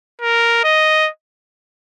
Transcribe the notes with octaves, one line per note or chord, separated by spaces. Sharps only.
A#4
D#5